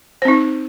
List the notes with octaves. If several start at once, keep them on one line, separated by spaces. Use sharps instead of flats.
C4 D#4 C5